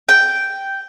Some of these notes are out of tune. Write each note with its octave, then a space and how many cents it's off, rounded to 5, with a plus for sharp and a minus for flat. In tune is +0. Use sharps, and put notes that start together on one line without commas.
G5 -5